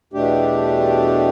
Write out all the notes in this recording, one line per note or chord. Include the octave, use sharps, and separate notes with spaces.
E2 B2 A3 D4 G4